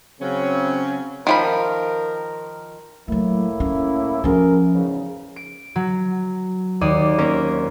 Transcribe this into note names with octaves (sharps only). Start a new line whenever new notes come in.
C#3 F#3 C4 C#4
D#3 F3 A#4 B5
A2 F#3 A3 A#3 E4
C#4
F3 C#4 F#4 G#4 A#4
E2 G#2 C#3
D7
F#3
D#2 D5 D#6
A#3 C4 C#4 A#4